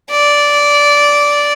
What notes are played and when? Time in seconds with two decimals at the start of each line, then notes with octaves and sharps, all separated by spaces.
0.11 D5